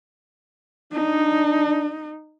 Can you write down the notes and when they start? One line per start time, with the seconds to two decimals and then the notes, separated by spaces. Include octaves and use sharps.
0.93 D4 D#4